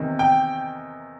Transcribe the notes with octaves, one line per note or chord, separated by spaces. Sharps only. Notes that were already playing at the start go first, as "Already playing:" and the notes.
Already playing: E2 C3 D#3
G5